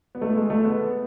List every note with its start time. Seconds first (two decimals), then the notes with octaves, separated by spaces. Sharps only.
0.15 B3
0.21 A3
0.36 G#3
0.50 A3
0.64 B3